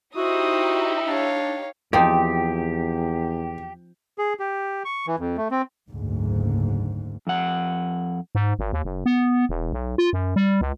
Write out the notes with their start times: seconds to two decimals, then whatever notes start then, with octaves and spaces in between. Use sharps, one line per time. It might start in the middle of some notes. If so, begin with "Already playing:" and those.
0.16 D#4 E4 F#4 G4 C5 D#6
1.08 D4 C#5 F5
1.93 E2 F3 C4 D#4 G4 G5
4.18 G#4
4.40 G4
4.85 C#6
5.07 E3
5.19 F2
5.37 A3
5.51 C4
5.89 F#1 D2 G#2
7.27 F2 F#5
8.35 G#2
8.59 G#1
8.73 D#2
8.84 F#1
9.06 B3
9.49 E1
9.73 B1
9.98 F4
10.13 F#2
10.36 G3
10.61 C#2